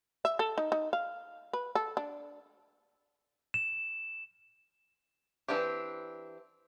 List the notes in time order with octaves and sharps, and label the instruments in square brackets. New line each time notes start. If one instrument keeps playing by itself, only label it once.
[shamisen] E5
A4
D#4
D#4
F5
B4
A4
D4
[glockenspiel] E7
[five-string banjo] E3 C4 D4 G4